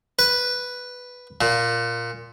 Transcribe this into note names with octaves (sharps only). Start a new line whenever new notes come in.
B4
A#2